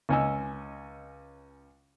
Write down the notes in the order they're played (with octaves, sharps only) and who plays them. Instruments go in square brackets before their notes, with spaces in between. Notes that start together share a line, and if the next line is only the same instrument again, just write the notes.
[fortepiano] C#2 C#4 D#5 G#5 E6